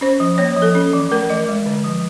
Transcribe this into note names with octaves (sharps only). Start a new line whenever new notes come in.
C#4 C5
F3
A#3 C#5
F3
A4
C#4
E3
A3 A#4
E3 D#5
G#3
D3
F3